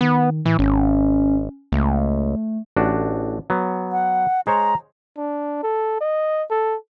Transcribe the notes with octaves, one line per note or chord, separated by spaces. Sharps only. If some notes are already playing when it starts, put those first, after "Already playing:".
D#3 B3
A2 E3
G#1 C#4
C#2 A3
A1 D4 F#4
F#3 B3
F#5
G#3 C5 C#5 A#5
D4
A4
D#5
A4